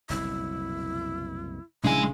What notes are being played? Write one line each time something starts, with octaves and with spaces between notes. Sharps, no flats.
F#1 C2 B2 E4
A#1 C#3 G3 G#3 D4 E4 G#5